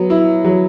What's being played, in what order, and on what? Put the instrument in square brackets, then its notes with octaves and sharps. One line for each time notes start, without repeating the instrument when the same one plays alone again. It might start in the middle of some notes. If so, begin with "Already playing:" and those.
Already playing: [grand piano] F#3 B3
E4
F#3